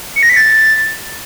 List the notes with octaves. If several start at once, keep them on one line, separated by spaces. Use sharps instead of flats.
C#7
A#6
B6
A6